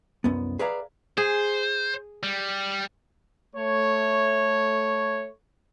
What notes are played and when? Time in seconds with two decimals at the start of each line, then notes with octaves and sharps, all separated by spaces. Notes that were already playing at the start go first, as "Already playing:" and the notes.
0.24 C2 F#2 B3
0.59 G#4 B4 D5 E5 F5 A#5
1.18 G#4 C5
2.23 G3
3.56 A3 C#5